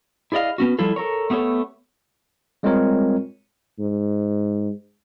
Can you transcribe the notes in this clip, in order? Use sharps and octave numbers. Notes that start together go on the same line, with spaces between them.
E4 G#4 D5 D#5 F5
B3 C#4 F#4
F3 G3 E4 F4 A4
A4 A#4 C#5
A3 B3 G4 A4 C#5
G3 G#3 C4 F4 A#4 C#5
G#2